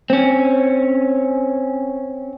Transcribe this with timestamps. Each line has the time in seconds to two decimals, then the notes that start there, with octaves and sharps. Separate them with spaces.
0.10 C4 C#4